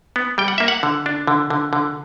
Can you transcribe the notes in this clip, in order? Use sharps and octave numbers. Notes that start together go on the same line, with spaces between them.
B3
G3 G5
F#5
A#3 E5
F#5
D3
D4
D3
D3
D3